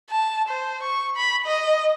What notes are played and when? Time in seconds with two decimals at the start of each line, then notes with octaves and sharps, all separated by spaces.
0.11 A5
0.48 C5
0.83 C#6
1.17 B5
1.46 D#5